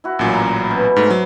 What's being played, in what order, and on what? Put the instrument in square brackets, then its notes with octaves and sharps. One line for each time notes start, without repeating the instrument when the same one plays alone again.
[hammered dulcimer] E4 F#4
[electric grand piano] A1 A#2 F#3 [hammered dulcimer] C#4
[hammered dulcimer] G3 E5 A#5
B2
[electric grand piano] G#2 A3 [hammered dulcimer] C4
[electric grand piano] F#3